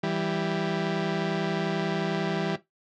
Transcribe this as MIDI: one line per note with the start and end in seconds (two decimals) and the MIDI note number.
0.03 2.55 52
0.03 2.55 55